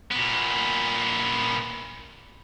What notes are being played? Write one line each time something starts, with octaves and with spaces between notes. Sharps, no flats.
A#2 B3